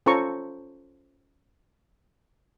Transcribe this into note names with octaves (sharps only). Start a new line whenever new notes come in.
C#4 F4 A4 C5 A#5 C#6